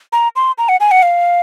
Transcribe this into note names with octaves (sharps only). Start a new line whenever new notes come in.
A#5
C6
A#5
F#5
G#5
F#5
F5